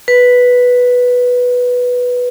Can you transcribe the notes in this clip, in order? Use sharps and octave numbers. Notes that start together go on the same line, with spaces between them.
B4